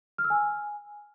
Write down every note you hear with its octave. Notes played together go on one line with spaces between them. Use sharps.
F6
E6
G#5